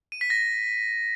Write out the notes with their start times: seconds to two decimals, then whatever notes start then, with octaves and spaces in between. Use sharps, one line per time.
0.12 D#7
0.21 B6
0.30 A#6